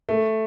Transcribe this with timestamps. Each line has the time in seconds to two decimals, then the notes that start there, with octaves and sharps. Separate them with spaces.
0.09 A3